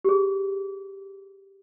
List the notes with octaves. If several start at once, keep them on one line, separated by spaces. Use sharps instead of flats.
G4 G#4